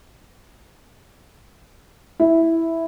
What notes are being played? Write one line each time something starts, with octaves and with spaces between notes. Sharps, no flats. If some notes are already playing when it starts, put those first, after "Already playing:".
E4